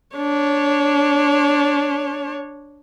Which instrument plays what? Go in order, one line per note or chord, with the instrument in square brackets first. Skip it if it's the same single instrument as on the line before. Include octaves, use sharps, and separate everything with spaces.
[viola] D4 C#5